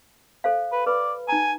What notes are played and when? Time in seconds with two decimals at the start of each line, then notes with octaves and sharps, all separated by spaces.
0.44 A4 C5 F5
0.72 B4
0.87 B4 D5 B5
1.29 D#4 G#5 A#5